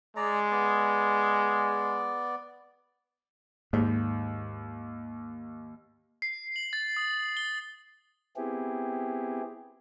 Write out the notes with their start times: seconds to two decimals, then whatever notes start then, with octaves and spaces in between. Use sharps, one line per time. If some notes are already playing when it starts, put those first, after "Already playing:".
0.16 G#3 D5 A#5
0.51 B3 D5
3.73 D#2 G#2
6.22 C7
6.56 F#7
6.73 A6
6.97 D#6
7.37 G7
8.36 B3 C4 E4 G4 G#4